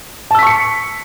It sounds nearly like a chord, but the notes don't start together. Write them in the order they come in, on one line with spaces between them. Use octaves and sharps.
A5 E6 B6 C#6 C#7